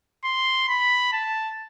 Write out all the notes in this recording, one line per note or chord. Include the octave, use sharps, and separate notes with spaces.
C6
B5
A5